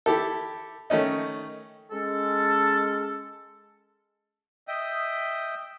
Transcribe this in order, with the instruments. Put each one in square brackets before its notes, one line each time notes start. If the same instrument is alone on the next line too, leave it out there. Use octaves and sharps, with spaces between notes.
[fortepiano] E4 G4 A4
D#3 A3 C#4 D#4
[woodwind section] G#3 C#4 A4
[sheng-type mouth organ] D#5 E5 G5 D#6